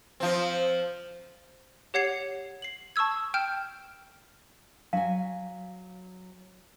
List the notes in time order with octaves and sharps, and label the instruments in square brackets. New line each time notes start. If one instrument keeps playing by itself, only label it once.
[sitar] F3 C4
[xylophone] G4 C#5 F#5 G#6 C7 F7
C7 F#7
A5 C#6 D#6 E6 G#6
G5 F6 G6 D7 E7
[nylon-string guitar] F#3 G#5 [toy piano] F5